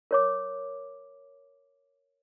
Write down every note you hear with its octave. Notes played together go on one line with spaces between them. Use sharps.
A#4 C#5 D6